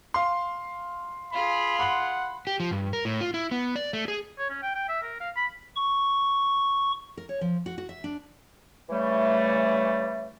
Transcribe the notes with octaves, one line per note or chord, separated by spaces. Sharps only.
F5 C6
F4 G#4 B5
F#5 B5 C6 F#7
G4
F3
G2
A#4
A2
F4
E4
B3
D5
A3
G#4
C#5
C#4
G5
G5
E5
A#4
F5
B5
C#6
A#4
C#5
F3
F#4
F#4
E5
D4
C#3 E3 G3 A3